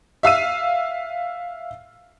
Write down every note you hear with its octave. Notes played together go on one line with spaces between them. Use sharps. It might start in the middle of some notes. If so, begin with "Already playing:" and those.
E5 F5 E6 D#7